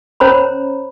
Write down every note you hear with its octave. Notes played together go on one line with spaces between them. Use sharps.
C#4 C5 C#5 A#5 B5